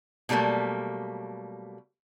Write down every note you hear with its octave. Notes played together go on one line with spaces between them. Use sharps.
B2 F#3 G3 A3 A#3